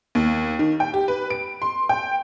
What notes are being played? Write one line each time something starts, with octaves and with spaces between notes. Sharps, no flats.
D#2
D#3
G5
G4
B4
D7
C6
G5